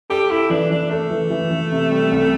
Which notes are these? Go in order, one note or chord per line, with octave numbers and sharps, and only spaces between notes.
G4 A4
E4 A4
E3 D4
E3 D4
A3 A4
E3
E3
E3
C3
G3
C2